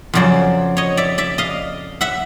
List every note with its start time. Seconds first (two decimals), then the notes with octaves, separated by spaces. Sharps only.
0.14 F2 C#3 F#3 C5 D5
0.77 C#5 D#5
0.97 D5 E5
1.18 D5 E5
1.38 D#5 F5
2.01 E5 F#5